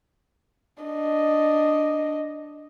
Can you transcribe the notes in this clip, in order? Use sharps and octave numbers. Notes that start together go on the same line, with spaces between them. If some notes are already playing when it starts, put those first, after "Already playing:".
D4 D#5